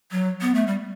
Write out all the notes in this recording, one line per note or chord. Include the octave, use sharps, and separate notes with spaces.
F#3
B3
A3
G3